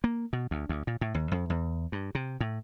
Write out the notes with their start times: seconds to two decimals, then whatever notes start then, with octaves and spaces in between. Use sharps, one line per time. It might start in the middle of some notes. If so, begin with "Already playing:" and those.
0.04 A#3
0.33 B2
0.51 D2
0.69 D2
0.87 A#2
1.01 A2
1.14 D#2
1.32 F2
1.50 E2
1.92 G2
2.15 C3
2.40 A2